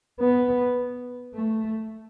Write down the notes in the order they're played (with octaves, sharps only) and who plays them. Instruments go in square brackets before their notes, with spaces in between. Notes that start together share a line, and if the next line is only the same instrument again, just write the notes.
[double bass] B3
A3